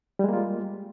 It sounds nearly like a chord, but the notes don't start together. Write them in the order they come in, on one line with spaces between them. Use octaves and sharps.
G3 G#3 A#3 F4